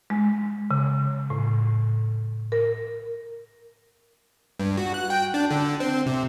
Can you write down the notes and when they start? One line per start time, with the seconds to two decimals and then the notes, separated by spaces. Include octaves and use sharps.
0.10 G#3
0.71 C#3
1.30 A2
2.52 A#4
4.59 G2
4.77 F#4
4.94 F#6
5.10 G5
5.34 D4
5.50 D3
5.80 C4
6.06 C3